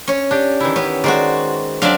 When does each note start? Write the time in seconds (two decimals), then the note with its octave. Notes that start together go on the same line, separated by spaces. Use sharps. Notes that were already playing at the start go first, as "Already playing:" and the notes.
0.07 C#4 C#5
0.31 D4 G4
0.60 D#3 E3 E4
0.76 B3 C#4
1.04 D#3 G#3 F#4 C5 D5
1.82 F#3 C4 D4 D5 E5 F5